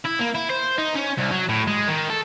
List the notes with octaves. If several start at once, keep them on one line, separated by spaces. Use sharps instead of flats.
E4
A#3
E4
C5
D#4
C#4
C2
F#3
A2
G#3
D#3
A4